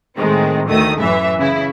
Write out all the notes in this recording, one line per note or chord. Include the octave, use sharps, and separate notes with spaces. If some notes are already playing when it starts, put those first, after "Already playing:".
A2 D#3 G#3 C4
D2 D#3 A3 D#6
A1 F#2 E3 E5
C#3 E4